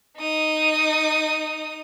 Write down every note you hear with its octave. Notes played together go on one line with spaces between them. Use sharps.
D#4 D#6